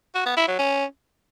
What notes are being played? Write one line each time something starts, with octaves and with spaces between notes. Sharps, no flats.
F#4
B3
E4
F#3
C#4